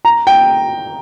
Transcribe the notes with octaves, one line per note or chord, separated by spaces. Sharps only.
A#5
G5